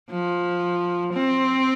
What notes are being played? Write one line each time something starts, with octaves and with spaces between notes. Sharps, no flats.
F3
C4